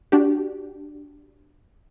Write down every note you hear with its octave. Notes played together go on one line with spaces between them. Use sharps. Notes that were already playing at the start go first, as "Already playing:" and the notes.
D4 F#4 G4